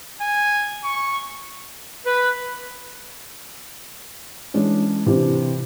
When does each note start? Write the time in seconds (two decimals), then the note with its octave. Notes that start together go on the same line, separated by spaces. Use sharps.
0.21 G#5
0.84 C#6
2.06 B4
4.54 E3 G#3 C#4 D4 E4
5.06 C3 E3 C4 D4